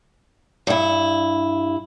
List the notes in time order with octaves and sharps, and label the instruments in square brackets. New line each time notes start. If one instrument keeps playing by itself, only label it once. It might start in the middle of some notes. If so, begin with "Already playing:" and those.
[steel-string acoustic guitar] G2 E4